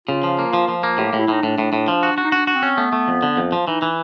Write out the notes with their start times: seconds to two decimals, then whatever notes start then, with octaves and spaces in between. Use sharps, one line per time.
0.08 C#3 F4
0.23 F3
0.39 A#3
0.53 F3
0.68 F3
0.83 A#3
0.98 A2 G4
1.13 A2
1.20 E4
1.28 A2 D#4
1.43 A2 D4
1.58 A2
1.73 A2
1.88 F3
2.03 F#4
2.18 F#4
2.25 D#4
2.32 D4 F#4
2.47 F#4
2.55 C4
2.63 C#4
2.77 A3 B3
2.93 A3
3.08 F2
3.23 D3
3.37 F2
3.52 F3
3.67 E3 D#4
3.82 E3